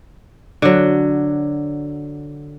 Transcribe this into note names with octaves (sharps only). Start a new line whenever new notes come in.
D3 F#3